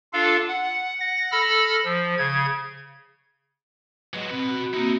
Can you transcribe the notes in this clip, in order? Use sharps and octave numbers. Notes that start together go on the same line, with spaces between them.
D4 F4 A4 F5
F#5
F#5 A#6
A4 B5 E6 F6 A#6
F3
C#3 G#6
F#3 G#3 B4 D#5
B2 C4 B4
F#4
A#3 C4 D#4 E4 F#4